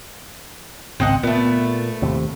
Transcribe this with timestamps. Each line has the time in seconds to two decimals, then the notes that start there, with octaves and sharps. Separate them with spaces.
1.00 G#1 C#2 C4 D#5 F#5
1.23 A#2 A3 B3
2.02 D#2 A2 C3